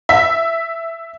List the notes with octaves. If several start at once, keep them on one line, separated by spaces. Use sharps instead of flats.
E5 B6